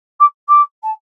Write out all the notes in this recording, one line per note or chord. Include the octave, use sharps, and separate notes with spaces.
D6
D6
A5